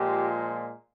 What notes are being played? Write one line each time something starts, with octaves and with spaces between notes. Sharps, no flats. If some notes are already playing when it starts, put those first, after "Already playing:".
Already playing: A#2 F3 G#3 G4